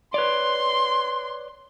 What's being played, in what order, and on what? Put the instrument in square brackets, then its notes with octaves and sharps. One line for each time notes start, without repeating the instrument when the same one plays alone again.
[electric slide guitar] B4 C#5 D5 [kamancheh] C6